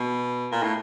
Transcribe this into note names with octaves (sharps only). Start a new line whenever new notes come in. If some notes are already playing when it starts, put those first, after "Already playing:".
Already playing: B2
A#2
A2